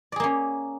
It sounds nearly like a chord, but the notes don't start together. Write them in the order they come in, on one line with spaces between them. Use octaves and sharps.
D5 G#4 A#3 C#4